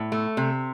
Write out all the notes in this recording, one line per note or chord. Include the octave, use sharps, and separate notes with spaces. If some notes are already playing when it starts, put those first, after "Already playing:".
Already playing: A2
A3
C3